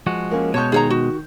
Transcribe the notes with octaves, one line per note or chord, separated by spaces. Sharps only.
F3 G#3 F#4
A#3 C#4
B2 G#3 C#5 A5 C#6 G6
D#3 G#4 C#5 A#5
F#4